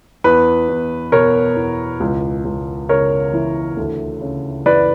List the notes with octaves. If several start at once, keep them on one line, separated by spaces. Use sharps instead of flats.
E2 B4
E2
B2 A#4 C#5
E2
C#2
C#2
C#3 A#4 C#5
E3
D2
C#3
E3 B4 D5